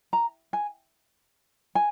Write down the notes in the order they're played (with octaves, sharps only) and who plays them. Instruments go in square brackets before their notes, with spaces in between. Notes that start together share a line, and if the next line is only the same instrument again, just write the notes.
[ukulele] A#5
G#5
G#5